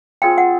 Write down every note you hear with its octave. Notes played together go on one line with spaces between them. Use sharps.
C4 F4 G#4 C5 G5
F#5